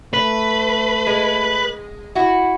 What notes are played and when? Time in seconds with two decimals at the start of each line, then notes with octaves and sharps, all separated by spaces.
0.14 A3 B4
1.07 G#3
2.15 E4 F#4